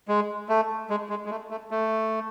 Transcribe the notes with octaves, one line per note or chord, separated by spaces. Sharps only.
G#3
A3
G#3
G#3
G#3
A3
A3
A3